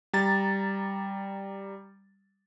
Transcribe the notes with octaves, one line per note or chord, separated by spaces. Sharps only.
G3 A#5 A6